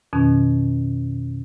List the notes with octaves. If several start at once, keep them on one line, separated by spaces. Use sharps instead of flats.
F2 B2 D#3 C#4